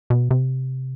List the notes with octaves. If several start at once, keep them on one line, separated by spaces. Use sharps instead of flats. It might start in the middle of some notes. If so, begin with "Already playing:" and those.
B2
C3